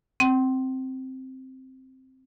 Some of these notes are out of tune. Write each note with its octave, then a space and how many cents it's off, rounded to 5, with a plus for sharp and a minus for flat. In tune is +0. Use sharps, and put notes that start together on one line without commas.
C4 +0 G5 -40